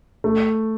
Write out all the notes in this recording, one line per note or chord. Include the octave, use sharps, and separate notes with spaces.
A3